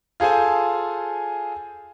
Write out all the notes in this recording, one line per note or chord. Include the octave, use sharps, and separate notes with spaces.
F4 G#4 A4 C5 G#5